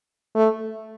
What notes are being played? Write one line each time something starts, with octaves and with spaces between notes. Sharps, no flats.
A3